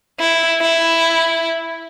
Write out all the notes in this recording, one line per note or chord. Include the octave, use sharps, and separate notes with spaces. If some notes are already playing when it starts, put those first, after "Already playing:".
E4
E4